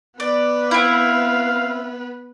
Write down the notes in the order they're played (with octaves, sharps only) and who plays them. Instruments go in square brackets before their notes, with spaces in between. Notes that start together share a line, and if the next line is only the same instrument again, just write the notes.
[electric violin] B3 B4 [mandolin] D5
[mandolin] C4 E4 [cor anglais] F5